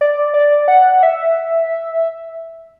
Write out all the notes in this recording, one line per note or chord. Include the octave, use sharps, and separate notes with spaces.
D5
D5
F#5
E5